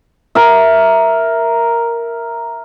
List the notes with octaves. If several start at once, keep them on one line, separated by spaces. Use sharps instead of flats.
A#4 E5